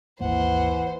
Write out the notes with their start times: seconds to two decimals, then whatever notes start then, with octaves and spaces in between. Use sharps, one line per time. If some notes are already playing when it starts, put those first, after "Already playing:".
0.20 G#1 D#2 E3 A#3 C5 F#5